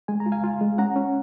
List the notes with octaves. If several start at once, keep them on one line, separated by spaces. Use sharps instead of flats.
G#3 G#5
A#5
F4
F5 G#5
F4
G#3
C#4 F#5 A#5
C#4